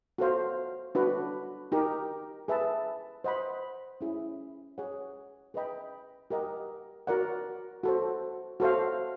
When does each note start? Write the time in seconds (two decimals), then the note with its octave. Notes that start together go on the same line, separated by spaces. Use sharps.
0.18 F#4 A4 C5 F5
0.95 D4 F#4 B4
1.72 D#4 G4 A#4
2.48 G#4 B4 E5 A5
3.24 C5 D#5 F#5 B5
4.01 C#4 E4 G#4
4.78 G#4 C#5 F#5
5.54 G#4 B4 D#5 G5 B5
6.30 G4 A#4 D#5 F#5
7.07 F#4 A#4 D5 F#5
7.83 F#4 A4 C5
8.60 F#4 A4 C5 F5